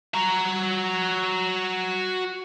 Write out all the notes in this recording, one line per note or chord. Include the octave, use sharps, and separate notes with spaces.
F#4 A#5